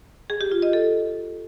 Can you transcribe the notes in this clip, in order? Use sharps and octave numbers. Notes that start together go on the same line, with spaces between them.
G#4
G4
F4
D#5
A4